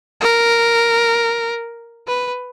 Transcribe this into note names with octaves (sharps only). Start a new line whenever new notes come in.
A#4
B4